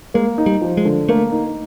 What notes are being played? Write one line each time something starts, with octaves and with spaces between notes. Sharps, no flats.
G#3 A#3
D#4
G3
F3
G#3
D3
A3 A#3
D#4